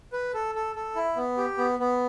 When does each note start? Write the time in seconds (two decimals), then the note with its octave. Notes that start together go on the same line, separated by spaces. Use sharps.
0.13 B4
0.34 A4
0.55 A4
0.76 A4
0.96 E4
1.16 B3
1.37 G4
1.58 B3
1.79 B3